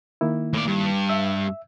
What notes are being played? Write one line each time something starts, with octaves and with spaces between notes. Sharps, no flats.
D#3 A#3 E4
A2 D5
G2
E5 E6